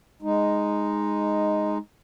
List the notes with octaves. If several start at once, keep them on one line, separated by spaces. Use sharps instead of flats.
G#3 D#4